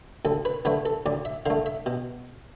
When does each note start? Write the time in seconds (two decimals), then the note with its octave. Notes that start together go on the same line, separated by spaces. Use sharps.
0.25 D2 A4
0.45 B4
0.65 D3 A3 B4
0.86 A4
1.06 D2 D5
1.25 E5
1.46 D3 A3 F5
1.66 E5
1.86 B2